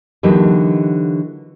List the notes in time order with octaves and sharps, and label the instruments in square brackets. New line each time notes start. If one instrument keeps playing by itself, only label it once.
[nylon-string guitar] D3 E3 F#3 A#3 D#4 G4